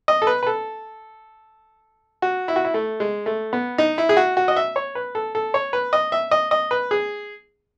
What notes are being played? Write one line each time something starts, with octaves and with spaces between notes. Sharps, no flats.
D#5
A4
B4
B4
A4
F#4
E4
F#4
E4
A3
G#3
A3
B3
D#4
E4
G#4
F#4
F#4
D#5
E5
C#5
B4
A4
A4
C#5
B4
D#5
E5
D#5
D#5
B4
G#4